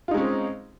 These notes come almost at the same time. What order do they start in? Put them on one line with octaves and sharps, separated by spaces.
F4 D#4 G#3 C#4 C4